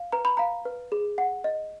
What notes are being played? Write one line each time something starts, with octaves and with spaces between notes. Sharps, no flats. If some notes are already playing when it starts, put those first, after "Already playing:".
Already playing: F5
B4 A#5
B5
F5 A#5
B4
G#4
F#5
D#5